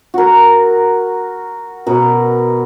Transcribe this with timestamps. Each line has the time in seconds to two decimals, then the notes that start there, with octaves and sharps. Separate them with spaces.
0.14 F#4 A#4
1.86 B2 A#4